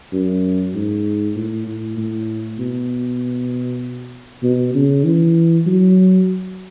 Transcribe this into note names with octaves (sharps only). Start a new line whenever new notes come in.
F#2
G#2
A2
A2
A2
B2
B2
C#3
E3
F#3